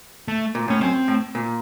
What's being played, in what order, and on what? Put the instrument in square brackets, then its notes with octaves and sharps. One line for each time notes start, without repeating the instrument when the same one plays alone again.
[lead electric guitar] A3
[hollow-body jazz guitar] A#2
[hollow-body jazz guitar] A2 [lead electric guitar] C#4
[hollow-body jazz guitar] F#2 [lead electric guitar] C4
[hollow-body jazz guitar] A2
A#2